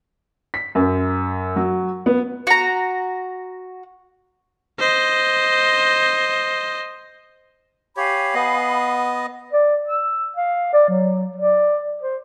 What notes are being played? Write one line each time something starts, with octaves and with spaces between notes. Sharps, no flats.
B6
F#2
F#3
B3
F#4 A#5
C5 D#5
G4 C#5 F5 G#5 B5
B3 D#5
D5
E6
F5
D5
F#3
D5
C5